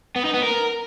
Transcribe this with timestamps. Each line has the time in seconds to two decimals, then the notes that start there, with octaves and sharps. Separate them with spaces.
0.16 B3
0.25 D#4
0.34 B3
0.43 A#4